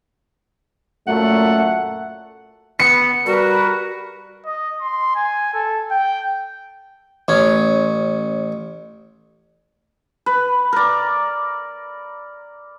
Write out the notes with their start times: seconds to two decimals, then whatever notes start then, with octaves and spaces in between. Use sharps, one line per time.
1.07 F#2 A#2 A3 F#5
2.80 B3 C#7
3.26 G3 F#4 A#4 B4
4.46 D#5
4.81 C6
5.15 G#5
5.54 A4
5.91 G5
7.28 A1 C#4
10.26 B4
10.73 A#4 D5